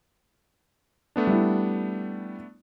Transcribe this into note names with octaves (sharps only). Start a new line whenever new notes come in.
A3 B3 D4
G3 E4